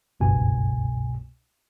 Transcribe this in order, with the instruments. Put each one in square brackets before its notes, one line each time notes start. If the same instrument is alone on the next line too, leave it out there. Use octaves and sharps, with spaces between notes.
[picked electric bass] F#1 G2 [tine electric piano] C2 B2 G#5